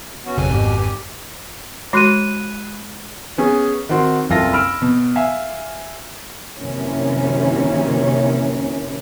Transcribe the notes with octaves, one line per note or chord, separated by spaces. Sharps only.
B3 C#4 F#4
G#1 F2 C#3 F#3 G#5
G#2 B2 G4
G4
G#3 F#4 B5 F#6 D#7
B3 C#4 G#4
D#3 C4 F#4 C6
F#1 C2 F4 A4 A#6
B5 E6 F6 D7
B2
E5 F5 G#5
F#2 C3 D#3 E3 A#3 C#4